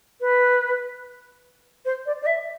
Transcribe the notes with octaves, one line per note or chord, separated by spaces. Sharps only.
B4
C5
D5
D5
E5